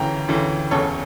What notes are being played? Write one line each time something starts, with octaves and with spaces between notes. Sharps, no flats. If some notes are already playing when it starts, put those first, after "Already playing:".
Already playing: D2 C#3 E3 G5 A#5
D2 C#3 E3
E1 E2 C#3 A4 C#5